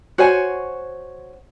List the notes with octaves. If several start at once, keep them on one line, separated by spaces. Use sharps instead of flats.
F#4 C5 C#5 G#5